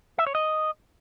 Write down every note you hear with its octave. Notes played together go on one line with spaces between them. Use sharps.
E5
C#5
D#5